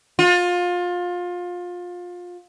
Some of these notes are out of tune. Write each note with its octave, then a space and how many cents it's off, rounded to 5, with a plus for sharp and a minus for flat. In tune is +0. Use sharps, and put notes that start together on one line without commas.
F4 +25